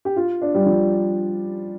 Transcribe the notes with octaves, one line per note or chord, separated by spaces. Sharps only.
G4
F4
D4
G3
F3